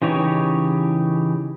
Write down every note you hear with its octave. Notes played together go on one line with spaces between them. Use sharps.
C#3 E3 D#4 G4 C#5